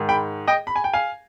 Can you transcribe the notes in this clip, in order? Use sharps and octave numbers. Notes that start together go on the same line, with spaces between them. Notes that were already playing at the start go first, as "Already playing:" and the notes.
Already playing: G#2 D#3 G#3
G5 B5
D#5 G5
B5
G#5
G5
F5 G#5